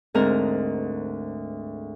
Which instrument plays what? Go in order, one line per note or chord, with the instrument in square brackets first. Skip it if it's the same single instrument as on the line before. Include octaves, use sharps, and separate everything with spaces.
[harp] D2 G#2 C4 A#4 A#5